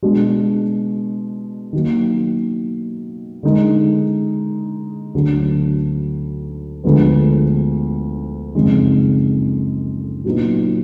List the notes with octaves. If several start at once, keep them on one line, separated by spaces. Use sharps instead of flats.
B2 G#3 D4 F#4
D#3 F#3 A#3
D3 G#3 D#4 A#4
D2 D3 F#3 D4 F#4
D2 D3 F3 G#3 B3
F#1 F2 D#3 G#3
A#2 F#3 B3 D#4